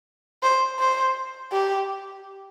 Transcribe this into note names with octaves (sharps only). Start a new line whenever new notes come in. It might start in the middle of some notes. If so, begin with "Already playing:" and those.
C5
C5
G4